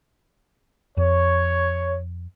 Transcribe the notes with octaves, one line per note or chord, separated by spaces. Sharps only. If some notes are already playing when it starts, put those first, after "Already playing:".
F2 C#5